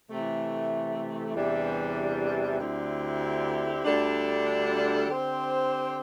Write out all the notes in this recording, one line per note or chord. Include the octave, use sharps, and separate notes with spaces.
C3 E3 A3
E2 C3 E3 G3 D4
D2 D3 C4 E4 G4
D2 D3 G3 D4 A4
D3 C4 G4 C5